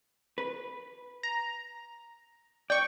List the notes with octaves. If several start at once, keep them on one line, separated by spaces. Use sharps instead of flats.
B4
A#5
D5 G5 C#6